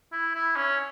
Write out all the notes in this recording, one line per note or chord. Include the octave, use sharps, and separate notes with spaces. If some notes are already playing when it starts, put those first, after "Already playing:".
E4
E4
C#4